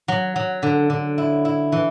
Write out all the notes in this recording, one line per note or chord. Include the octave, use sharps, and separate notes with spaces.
F#3
F#3
D3
D3
E4
E4
E3